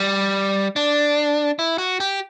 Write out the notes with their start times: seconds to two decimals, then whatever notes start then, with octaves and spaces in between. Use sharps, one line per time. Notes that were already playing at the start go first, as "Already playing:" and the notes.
Already playing: G3
0.76 D4
1.59 E4
1.78 F#4
2.00 G4